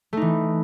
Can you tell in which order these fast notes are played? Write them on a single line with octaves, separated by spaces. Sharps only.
A3 D#4 E3